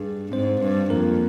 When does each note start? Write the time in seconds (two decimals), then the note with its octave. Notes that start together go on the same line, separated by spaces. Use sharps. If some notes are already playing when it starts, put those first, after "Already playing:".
Already playing: G2 G#4
0.32 G#2 C4 C5
0.61 G2
0.90 F2 A#3 A#4